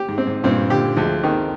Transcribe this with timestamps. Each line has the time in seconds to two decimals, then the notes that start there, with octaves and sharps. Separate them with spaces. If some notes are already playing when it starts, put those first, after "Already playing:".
Already playing: G4
0.09 G#2
0.18 C4
0.27 G#2
0.44 G2 A#2 C4
0.70 A#2 D3 G4
0.96 D2 F3 G#3
1.23 D#3 G#3 C4